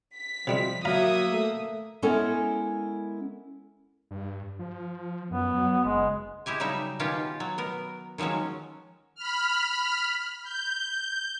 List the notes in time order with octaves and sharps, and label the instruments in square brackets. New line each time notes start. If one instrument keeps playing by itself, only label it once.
[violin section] B6
[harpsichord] C3 G3 G#3 [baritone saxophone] F3
[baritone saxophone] F#3 [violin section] A#3 E5 D#6 [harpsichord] F5 A#5 B5
[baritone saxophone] A3
[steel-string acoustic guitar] G#3 B3 C#4 E4 A4 A#4
[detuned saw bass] G2
F3
[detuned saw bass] F#2 [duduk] B3
[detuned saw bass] F#3
[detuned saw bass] F#1 [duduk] G#3
[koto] G#3 E4 G4 G#5
C#3 F#3 G3 D#4 E5
B2 D#3 C#4 F4 G4
F#3
B3 A#4
D#3 F3 F#3 G#3 C#4
[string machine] B5 F6
G6